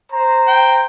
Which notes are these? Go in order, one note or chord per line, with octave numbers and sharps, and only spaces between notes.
C5 A#5
G5